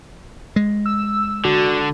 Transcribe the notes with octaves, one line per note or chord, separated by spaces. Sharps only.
G#3
E6
D3 F#4